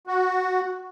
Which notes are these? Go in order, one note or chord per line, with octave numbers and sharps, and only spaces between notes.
F#4